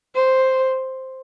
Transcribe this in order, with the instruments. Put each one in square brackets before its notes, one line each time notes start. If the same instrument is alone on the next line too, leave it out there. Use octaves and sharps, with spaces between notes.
[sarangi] C5